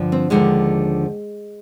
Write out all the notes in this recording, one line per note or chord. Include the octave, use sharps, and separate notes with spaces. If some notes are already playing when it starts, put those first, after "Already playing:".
Already playing: G2 D3 F3
C4
D#2 D3 F3 G#3